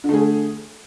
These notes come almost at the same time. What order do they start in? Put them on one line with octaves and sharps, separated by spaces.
D3 A3 G#4